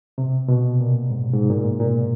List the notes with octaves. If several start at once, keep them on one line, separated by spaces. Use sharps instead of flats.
C3
B2
A#2
G#2
G#2
A#2
A2
A#2